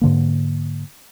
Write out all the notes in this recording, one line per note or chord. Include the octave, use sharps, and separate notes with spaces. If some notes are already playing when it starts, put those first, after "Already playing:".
G#2 D3 A#3